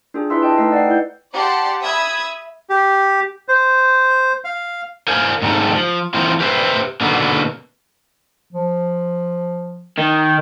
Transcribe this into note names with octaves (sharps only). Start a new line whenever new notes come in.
D4 F4 G4 G#4
E4 B4 E5 C6 E6
D#5 G5 A5
A3 D#4 B4 D#5 E6 C7
D5 F#5 G5 C7
E4 B4 G6
G4 D5 F#5 A5 C6
E5 B5 D#6 E6 G#6
G4
C5
F5
A#4 C5 F5 G#5
G#2 C3 D#3 G3 A3
F3
E3 C4 D#4 F4 C5
G4 B4 C5 E5
B2 D3 D#3 A#3 B3
F3
D#3